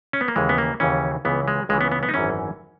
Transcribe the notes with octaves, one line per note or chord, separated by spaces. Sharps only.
C#4
B3
A#3
D#2 C#3 E3 G#3
B3
A#3
D#2 C#3 E3 C#4
C#2 C#3 E3 B3
G#3
C#2 C#3 E3 G#3
B3
B3
B3
D#4
G#1 F#2 E3 C#4